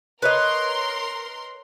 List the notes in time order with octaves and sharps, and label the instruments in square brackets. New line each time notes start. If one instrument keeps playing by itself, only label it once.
[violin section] A#4 C6 [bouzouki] B4 C#5 D#5